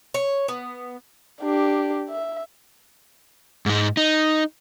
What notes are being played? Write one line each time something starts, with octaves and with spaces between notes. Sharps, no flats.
C#5
B3
D4 G4
E5
G#2 G#3
D#4